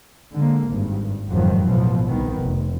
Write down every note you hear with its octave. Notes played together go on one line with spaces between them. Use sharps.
D3 G#3 A#3
G#1 G2
F#1 F2 G#2 D#3 F3 F#3
A1 B2 E3 F3
C2 D#3 B3
F1